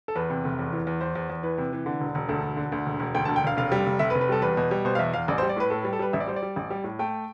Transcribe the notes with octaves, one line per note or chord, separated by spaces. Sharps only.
A4
E2 B4
C3
F1
E2
E3
E2
E2 C5
E2
E2
E3 B4
C3
E3
D3
E1
E1
D2 A4
E1
D3
D2
E1
E1
D2 G5
A5
E1
G5
E1 F5
F1 F5
G3
F1
F1 E5
B4
F1
B4
G3 A4
E2 B4
B2
G3
B2 C5
F5
E2 E5
E2 F5
A1 D5
C5
G3
D5
A2 B4
A2 A4
B4
G3
A4
G3 B4
A1 E5
D5
G3 C5
D5
G3
A1
G3
A2
A3 G5